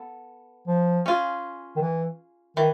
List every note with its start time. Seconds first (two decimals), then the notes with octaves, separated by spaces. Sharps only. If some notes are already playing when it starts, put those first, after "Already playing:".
Already playing: B3 A4
0.68 F3
1.06 C#4 F4 G#4
1.76 D#3
1.81 E3
2.57 D#3 E3